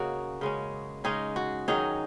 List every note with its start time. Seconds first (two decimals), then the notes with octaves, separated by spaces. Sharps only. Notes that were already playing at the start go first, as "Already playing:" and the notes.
Already playing: C#3 A#3 C#4 F#4 G#4 A#4 D#5
0.41 C#3 G#3 C#4
1.04 C#3 G#3 C#4 D#4 G#4
1.36 F#4
1.68 D#3 F#3 C#4 D#4 G#4